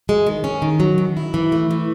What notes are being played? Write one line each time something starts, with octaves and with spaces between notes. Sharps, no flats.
G#3
D#3
C#4
D#3
F#3
D#3
E4
E3
A3
E3